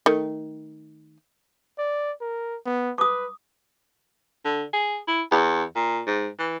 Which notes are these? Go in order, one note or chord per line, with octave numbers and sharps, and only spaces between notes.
D#3 A3
D5
A#4
B3
B4 D6 D#6
D3
G#4
E4
E2
A#2
G#2
E3